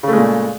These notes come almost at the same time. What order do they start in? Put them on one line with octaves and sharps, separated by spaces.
C#3 A3 G#3 A#2